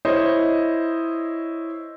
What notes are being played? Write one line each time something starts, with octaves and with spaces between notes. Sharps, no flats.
E4 C5 C#5 D#5